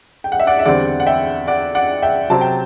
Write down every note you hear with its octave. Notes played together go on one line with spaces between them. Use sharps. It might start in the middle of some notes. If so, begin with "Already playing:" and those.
G5
F#5
E5
D5 F#5
E5
E2 D3 G3 C4 D5 F#5
F#5
E5 G5
D5 F#5
D5 F#5
E5 G5
C3 F#3 C4 A5
G5